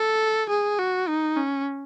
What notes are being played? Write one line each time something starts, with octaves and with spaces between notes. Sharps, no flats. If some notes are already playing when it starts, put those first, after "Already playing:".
Already playing: A4
G#4
F#4
D#4
C#4